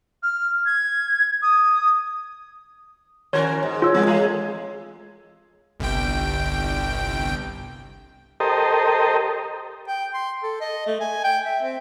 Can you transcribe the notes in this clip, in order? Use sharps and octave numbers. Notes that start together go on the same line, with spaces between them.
F6
G#6
D#6
D#3 C#4 F#4 A#4 C#5 G#6
G#2
F4 C#5 E6
E3 G#3 A#3 C4
A3 G#4
G1 C2 G5
G4 A4 A#4 C5 D#5
G5
C6
A4
D#5
A3
G#5
G5
E5
C4